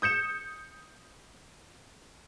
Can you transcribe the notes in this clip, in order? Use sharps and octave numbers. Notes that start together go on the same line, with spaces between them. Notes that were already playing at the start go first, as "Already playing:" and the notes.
D#6 G6 C#7 E7